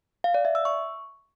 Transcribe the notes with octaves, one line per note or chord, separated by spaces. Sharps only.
F5
D5
E5
E6
C#6